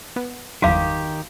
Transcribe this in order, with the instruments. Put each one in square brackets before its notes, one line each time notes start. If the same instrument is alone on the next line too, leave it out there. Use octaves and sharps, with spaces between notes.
[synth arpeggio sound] B3
[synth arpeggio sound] G1 E2 F#3 [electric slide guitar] D#3 G4 [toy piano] F#4 F5